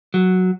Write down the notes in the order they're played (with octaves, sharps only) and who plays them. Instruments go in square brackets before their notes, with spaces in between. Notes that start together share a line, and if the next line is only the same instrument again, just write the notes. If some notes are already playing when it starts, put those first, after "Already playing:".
[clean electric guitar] F#3